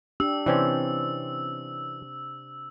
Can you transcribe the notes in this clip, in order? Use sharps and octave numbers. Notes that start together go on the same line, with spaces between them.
D4 G4 E6
C3 E3 C4 C#4 C5 D5